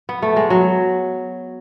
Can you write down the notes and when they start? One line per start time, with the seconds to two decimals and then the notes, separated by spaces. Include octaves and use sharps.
0.09 B3
0.22 A3
0.36 G#3
0.50 F#3